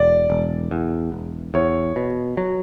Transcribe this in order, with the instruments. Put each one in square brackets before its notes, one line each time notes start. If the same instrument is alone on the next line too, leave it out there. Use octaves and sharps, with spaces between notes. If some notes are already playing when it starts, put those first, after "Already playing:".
Already playing: [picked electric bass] E1 [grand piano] D5
[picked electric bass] E1
E2
E1
[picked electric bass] E2 [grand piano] C#5
[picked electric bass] B2
F#3